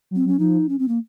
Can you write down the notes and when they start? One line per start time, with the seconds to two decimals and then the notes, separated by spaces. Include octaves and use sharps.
0.11 F#3
0.16 C4
0.25 F#3
0.28 C#4
0.39 F3 D#4
0.69 C#4
0.79 C4
0.88 A#3